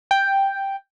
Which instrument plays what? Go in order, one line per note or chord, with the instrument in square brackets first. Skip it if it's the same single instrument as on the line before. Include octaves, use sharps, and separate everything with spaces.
[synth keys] G5